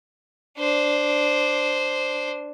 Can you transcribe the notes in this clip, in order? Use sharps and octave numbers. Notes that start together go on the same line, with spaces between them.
D4 C5